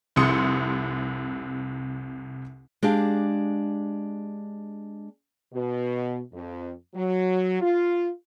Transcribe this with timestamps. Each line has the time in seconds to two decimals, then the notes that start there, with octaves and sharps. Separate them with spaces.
0.16 F1 C2 C3 C6 D#6 C#7
2.83 G#3 D4 G4 F5
5.53 B2
6.33 F2
6.94 F#3
7.61 F4